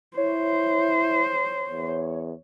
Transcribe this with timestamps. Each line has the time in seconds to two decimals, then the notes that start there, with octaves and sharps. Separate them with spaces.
0.17 E4 C5 C#5
1.69 E2